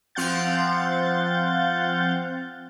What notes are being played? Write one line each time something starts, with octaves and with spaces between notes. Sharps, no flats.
F3 C4 F5 F#5 G6 A6